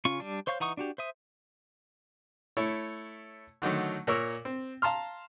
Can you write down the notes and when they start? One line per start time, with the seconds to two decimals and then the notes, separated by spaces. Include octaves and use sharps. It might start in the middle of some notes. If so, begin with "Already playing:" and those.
0.05 C#3 C#4 F4 C#6
0.20 G3 D4
0.47 C5 C#5 F5 C#6 G6
0.60 E3 D#4 F#5 C#6 D#6
0.77 D4 F#4 G4
0.98 C5 E5 D#6
2.57 A3 E4 C#5
3.62 D3 D#3 F#3 A3
4.07 A#2 A#4 C#5 C#6 E6
4.45 C4
4.82 F5 A5 A#5 C6 F6